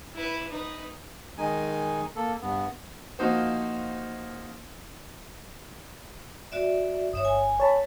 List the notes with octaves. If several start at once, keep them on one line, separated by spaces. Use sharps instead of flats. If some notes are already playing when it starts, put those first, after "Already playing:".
E4 B4
D#4 B4
D#3 G#3 D#4 G#5
A#3 A4
G2 B3
F3 A#3 D#4 F#4 C5
F#4 D5 E5
G1 C#5 E5 D#6
G#5
C#5 A5 B5